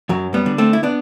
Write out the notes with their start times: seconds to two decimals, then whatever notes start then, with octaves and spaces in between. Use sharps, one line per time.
0.09 F#2 F#3
0.34 G3 B3
0.46 D3
0.58 A3 C4
0.73 E4
0.83 B3 D4